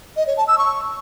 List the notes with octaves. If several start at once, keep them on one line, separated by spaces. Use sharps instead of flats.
D#5
C#5
A5
E6
C#6